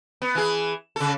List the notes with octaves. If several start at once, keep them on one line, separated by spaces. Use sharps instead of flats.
B3
E3 G#4
C#3 A4